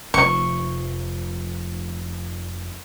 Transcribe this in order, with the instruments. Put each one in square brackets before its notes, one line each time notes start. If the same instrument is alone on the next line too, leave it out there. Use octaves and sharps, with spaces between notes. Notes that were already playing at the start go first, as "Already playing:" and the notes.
[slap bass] F1 F3 [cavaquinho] C#6